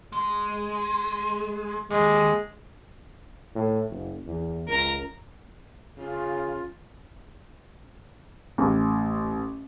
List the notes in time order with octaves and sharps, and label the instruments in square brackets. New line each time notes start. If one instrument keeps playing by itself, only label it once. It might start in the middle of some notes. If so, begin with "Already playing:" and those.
[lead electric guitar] G#3
[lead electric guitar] D#2 [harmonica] G#3
[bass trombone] A2
F#1
E2
[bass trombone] C#2 [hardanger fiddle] A#4 A#5
[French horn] C#3 [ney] F4
[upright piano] A1